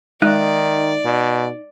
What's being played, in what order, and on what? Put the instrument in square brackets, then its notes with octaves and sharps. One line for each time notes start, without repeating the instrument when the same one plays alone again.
[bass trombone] D#3 [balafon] G#3 [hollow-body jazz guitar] D#4 E5 [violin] D5
[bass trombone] B2